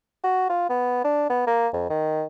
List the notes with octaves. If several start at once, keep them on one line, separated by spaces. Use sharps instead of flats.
F#4
F4
B3
D4
B3
A#3
F2
D#3